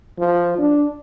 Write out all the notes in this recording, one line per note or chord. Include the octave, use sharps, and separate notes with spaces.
F3
D4